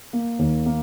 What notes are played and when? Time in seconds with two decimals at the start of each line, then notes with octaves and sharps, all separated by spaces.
0.13 A#3
0.39 D#2
0.66 A#3